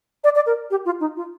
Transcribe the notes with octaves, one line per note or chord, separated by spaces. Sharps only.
D5
D5
A#4
G4
F4
D#4
F4